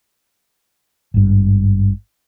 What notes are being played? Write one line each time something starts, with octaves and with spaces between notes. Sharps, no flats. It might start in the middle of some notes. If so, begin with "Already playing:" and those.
G#1 G2